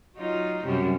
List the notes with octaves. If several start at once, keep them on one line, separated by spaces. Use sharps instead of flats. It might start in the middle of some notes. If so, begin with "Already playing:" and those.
F#3 D#4 F4
F#2 C3 G3